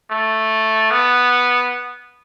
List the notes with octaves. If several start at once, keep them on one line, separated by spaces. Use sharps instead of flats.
A3
B3